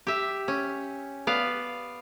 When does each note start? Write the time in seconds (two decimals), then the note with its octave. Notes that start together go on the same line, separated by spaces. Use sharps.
0.07 G4 E5
0.48 C#4
1.27 B3 D5 F5